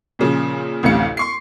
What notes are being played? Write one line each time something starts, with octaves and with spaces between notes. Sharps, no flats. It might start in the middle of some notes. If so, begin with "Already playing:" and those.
A#2 C#3 F3
A1 D2 A2 C3 F5 C#7
C6 C#6 C7